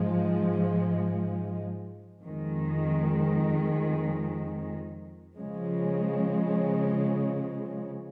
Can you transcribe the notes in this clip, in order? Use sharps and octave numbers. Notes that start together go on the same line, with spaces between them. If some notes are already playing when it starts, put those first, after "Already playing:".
Already playing: G#2 F3 G#3
F2 D#3 G#3
C#3 F3 G#3